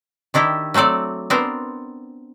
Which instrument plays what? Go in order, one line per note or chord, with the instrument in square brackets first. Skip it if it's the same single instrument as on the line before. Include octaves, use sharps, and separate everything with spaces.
[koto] D#3 D4 E4 G4
F#3 A3 C4 A4 D5
B3 C4 D4 A#4 C5